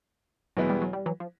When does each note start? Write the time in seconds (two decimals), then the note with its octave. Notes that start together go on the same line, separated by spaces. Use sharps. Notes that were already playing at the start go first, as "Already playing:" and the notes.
0.57 E2 B2 F#3 G#3 B3 E4
0.70 G3
0.82 F#3
0.93 G3
1.06 E3 F#3
1.20 F3